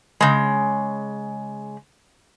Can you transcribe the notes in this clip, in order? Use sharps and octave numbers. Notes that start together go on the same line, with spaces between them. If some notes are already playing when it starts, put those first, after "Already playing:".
C#3 G#3